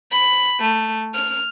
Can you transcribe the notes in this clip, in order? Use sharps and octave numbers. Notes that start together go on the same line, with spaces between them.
B5
A3
F6